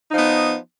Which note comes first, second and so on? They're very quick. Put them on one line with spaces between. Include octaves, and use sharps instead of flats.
D#4 F3 B3